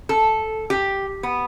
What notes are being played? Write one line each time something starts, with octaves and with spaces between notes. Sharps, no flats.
A4
G4
B3